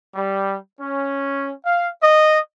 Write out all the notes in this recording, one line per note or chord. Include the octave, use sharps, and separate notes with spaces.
G3
C#4
F5
D#5